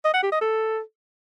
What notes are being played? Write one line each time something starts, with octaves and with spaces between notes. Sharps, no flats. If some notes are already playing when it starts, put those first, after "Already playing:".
D#5
F#5
G4
D#5
A4